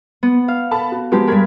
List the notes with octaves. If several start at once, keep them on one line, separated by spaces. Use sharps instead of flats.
B3
F5
A4 A5 B5
F#4
F3 F#3 G#3 B3 G4
G2 A#4 B5 G#6 B6